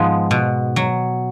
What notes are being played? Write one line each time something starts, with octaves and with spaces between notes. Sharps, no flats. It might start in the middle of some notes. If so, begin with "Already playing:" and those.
Already playing: G#2 F3 G#3 B3
B2
F#3